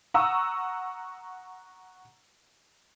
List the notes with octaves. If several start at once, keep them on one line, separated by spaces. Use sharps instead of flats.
F#5 A#5 C#6 D#6 E6